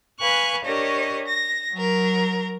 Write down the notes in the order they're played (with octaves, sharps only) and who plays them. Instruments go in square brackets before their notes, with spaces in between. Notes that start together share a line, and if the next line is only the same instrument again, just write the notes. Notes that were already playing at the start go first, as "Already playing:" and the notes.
[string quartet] B4 F5 G#5 C#6 F#6
D4 G4 A#4 C#5 D#5
A#6
F#3 A#4